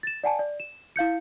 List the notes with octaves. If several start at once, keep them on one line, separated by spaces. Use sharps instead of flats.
A6 E7
D5 F#5 G#5 A5
D5
E7
E4 F5 G6 C#7